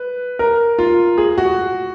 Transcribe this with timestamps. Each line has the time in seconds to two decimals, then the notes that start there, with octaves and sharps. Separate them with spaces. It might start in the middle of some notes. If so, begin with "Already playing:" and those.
Already playing: B4
0.39 A#4
0.79 F4
1.18 G#4
1.38 F#4